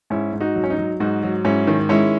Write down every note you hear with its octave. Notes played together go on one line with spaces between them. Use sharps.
G#2 C#4 E4
G#2
D#4 F#4
F#3
C#4
D#4
F#3
G#2 D#4 F#4
F#3
G#2 C#4 E4
D#3
G#3 C#4 E4